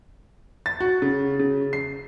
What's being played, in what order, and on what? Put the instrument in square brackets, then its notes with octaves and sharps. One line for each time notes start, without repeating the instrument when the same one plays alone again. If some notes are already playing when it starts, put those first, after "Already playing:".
[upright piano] A6
F#4
C#3
C#3
C7